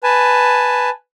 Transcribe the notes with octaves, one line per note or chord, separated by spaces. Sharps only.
B4 G#5 A5